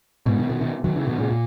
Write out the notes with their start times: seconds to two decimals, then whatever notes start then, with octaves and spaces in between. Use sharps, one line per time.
0.26 G#2 B2
0.38 B2 D#3
0.49 B2 D#3
0.61 B2 D#3
0.84 D#3 F#3
0.96 C#3 E3
1.07 B2 D#3
1.19 A#2 C#3
1.30 A#2